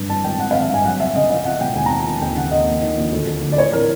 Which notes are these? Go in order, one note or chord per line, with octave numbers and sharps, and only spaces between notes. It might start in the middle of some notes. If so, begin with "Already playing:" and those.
Already playing: G2
E3 A5
G#1 G5
G#1 F#5
F5
G#1
E5
G2 G#5
F#3 F#5
E1 E5
C#3 D#5
C#2 F5
C#2 F#5
B2 G5
D#2 G#5
A#5
F3 A5
F3 A5
D#2 G5
C#3 F#5
D#2 D#5
A#1
D#3
A#1
D2
D2
D3
D5
E3 C#5
E3 A#4